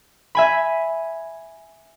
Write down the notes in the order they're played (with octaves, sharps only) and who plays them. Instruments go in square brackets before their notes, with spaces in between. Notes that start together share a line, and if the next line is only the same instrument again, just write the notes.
[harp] E5 G#5 B5